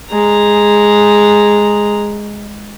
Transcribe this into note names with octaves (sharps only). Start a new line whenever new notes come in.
G#3 A#5